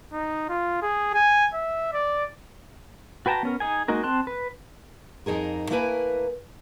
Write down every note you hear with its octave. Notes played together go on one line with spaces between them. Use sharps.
D#4
F4
G#4
G#5
E5
D5
F#4 B4 G5 A5 A#5
B3 C#4 A#4
D#4 G#4 G#5
G#3 A#3 D#4 F#4 A#4
C4 A5 C6 F#6
B4
F2 D#4 G#4 A#4
A3 A#3 E4 A#4 B4 G#5